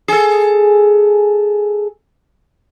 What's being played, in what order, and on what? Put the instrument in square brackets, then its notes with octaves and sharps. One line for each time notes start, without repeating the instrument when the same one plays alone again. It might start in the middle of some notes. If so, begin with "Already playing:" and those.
[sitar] G#4 A4